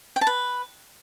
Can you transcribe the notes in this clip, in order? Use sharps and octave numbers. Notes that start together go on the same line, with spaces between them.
G5
A5
B4